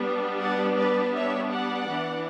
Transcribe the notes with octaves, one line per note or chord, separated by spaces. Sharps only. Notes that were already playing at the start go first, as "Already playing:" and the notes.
Already playing: G3 B3 D4
D5 F#5
B4 D5
C#5 E5
D5 F#5
E3 B3 D4